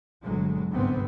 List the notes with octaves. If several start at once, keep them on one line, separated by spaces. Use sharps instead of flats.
G1 D2 B2 F#3 G#3
G1 C#2 G#2 C3 B3 C4